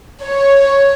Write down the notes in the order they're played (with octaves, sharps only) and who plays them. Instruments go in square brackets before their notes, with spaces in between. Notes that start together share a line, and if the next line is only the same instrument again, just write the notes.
[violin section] C#5